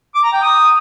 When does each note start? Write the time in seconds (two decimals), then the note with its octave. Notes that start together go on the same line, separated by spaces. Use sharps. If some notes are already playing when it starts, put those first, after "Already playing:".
0.15 D6
0.24 A#5
0.33 G5
0.42 D#6